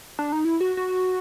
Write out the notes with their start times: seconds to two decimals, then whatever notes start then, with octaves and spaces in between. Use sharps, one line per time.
0.19 D4
0.32 D#4
0.45 E4
0.61 F#4
0.77 F#4